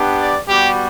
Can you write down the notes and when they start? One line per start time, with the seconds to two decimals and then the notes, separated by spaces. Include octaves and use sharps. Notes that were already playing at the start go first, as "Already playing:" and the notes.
Already playing: B3 D4 G4
0.19 D5
0.48 G3 B3 F#4 G4